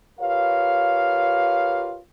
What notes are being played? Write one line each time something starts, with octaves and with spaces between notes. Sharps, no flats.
F4 G4 A#4 B4 C#5 F5